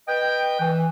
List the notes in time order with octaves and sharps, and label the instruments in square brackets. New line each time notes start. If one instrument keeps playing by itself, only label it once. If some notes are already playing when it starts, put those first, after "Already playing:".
[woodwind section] B4 D#5 G5
E3